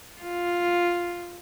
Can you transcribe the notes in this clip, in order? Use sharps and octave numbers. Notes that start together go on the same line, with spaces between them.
F4